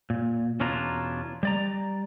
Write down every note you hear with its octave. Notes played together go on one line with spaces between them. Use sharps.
A#2
E2 B2 C#4 D4 F4 A#5
G3 D5 A#5